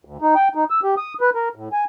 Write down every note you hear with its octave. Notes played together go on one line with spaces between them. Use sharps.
D2
D#4
G5
D#4
E6
G4
D#6
B4
A#4
A2
G#5